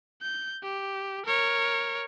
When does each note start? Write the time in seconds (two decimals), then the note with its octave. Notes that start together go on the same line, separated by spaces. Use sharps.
0.22 G6
0.63 G4
1.25 A#4 C#5